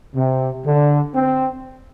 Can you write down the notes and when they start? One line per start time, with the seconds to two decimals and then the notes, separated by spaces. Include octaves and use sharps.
0.15 C3
0.65 D3
1.15 C4